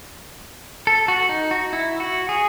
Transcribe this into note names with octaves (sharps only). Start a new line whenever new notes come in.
A4
F#4
D#4
F#4
E4
F#4
G#4